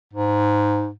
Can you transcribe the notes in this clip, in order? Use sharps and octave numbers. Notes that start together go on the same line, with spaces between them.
G#2